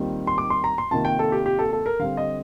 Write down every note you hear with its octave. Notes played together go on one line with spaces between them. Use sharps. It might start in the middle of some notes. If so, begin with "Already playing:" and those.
Already playing: D#2 D#3 G3 C4 F4
C6
D6
C6
A#5
C6
C3 D#3 A#3 F4 A5
G5
A4
G4
G4
A4
A4
A#4
D3 G3 C4 F5
D#5